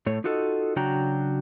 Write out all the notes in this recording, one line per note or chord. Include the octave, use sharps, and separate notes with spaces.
A2 A3 C#5
D#4 F4 F#4 A4 D5 D#5
C#3 F#3 D4 F#4 G5 A#5